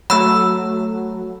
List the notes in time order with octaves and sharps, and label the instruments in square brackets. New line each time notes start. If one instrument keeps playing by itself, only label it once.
[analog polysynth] F#3 A3 [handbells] B5 E6